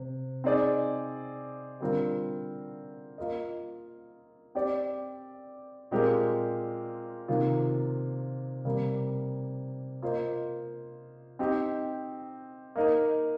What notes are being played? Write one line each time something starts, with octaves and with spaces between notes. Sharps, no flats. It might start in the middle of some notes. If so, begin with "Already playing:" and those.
Already playing: C3
C4 D#4 G#4 D5
D3 G3 C4 F4 A#4
A#3 F4 A#4 D#5
C4 G4 D5
A#2 G#3 C4 G4 A#4
C3 D#3 A#3 F4
C3 G3 A#3
A#3 F4 C5 D#5
C4 D#4 G4
A#3 D#4 A#4 D#5